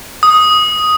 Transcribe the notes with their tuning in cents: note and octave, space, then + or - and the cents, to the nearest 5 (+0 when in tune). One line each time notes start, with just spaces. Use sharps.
D#6 +5